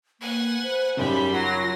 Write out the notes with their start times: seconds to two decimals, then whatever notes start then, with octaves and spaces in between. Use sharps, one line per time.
0.20 A#3 B4 F#5 G#5
0.62 C5
0.97 F#2 C#3 G3 D#4 G4 B5
1.31 F#3 F4 C6 A#6